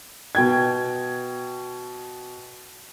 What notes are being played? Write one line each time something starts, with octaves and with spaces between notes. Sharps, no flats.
B2 G5 G#6